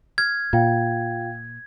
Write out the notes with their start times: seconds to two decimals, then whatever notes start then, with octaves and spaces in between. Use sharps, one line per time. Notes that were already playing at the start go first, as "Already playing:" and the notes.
0.18 F6 G#6
0.53 A#2 F4 F5 G5